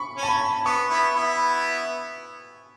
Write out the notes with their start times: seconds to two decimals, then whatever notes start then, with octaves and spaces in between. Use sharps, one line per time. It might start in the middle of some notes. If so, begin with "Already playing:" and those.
Already playing: B5 C#6
0.17 C#4
0.23 A5
0.29 B5
0.66 B3 C#6
0.90 B3 E4
1.15 B3 E4